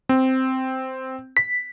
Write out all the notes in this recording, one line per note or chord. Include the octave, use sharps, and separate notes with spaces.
C4
B6